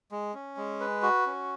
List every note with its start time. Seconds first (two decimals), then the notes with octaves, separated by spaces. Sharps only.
0.12 G#3
0.34 C#4
0.57 G#3
0.81 B4
1.03 F#4
1.26 C#4